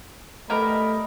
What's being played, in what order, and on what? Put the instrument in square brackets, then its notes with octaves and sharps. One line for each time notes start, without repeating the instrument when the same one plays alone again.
[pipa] G3 B3 A#4 [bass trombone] A3 [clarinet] D#5 [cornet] B5